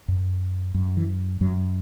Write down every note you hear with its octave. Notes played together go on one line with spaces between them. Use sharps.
F#2
F#2
E3
F#2 F#3